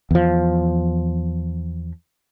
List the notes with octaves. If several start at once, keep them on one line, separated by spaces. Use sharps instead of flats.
E2 F3